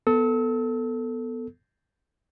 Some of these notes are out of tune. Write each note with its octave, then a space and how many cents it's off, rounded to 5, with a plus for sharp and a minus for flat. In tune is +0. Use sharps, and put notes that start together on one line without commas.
B3 +0 A4 +10 E6 -40